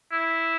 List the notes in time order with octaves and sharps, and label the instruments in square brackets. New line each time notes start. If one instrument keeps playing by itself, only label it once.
[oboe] E4